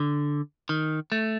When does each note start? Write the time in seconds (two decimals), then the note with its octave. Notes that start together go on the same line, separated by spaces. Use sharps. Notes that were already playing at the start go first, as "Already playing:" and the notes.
Already playing: D3
0.69 D#3
1.12 A3